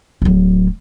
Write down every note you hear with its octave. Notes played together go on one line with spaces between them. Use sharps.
D1 F#3